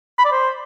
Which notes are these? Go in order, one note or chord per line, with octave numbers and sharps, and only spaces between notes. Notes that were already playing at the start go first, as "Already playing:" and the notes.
B5
D5
C5